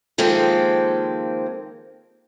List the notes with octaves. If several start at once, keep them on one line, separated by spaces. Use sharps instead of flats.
D#3 F3 G#3 A#3 C4 A4